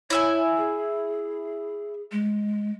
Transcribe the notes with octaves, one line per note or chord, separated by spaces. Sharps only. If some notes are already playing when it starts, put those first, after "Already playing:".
E4 C#5 E5 G#5
G#4
G#3